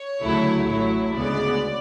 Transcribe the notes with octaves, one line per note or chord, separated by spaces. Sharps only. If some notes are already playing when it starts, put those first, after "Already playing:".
Already playing: C#5
D2 C#3 F#3 A3 E4
A1 A2 F#3 A3 E4
D2 C#3 G#3 B3 D5